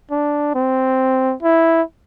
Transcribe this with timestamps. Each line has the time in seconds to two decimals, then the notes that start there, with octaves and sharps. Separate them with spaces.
0.11 D4
0.55 C4
1.42 E4